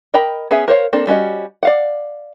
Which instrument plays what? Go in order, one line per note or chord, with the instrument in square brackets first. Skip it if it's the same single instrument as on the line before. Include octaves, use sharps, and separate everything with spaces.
[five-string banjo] A#4 D#5 G5 A#5 B5
B3 C#4 G#4 E5 G#5
A#4 C5 C#5 F5
A#3 C4 D4 A4
G3 C#4 F#4 D#5
D5 F5 F#5